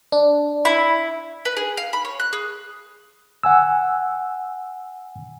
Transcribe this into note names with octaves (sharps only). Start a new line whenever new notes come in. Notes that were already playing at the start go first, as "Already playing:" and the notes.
D4
E4
B4
G#4
F5
B5
C#5
F#6
G#4
F#5 G#5 E6